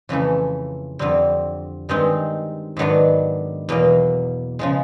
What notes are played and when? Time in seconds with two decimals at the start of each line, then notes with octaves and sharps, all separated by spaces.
0.09 F2 C#3 E3 A3
0.99 F2 D3 G3 C4
1.89 G2 D#3 G#3 C4 D#4
2.77 G#2 D#3 F#3 B3 D4
3.69 E2 B2 F#3 A#3
4.59 C#3 F3 G#3